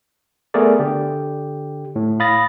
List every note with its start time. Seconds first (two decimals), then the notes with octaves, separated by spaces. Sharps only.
0.54 A3 B3 G#4 A#4 D5
0.79 D3 G4
1.96 A2
2.20 F5 B5 D#6 A6 A#6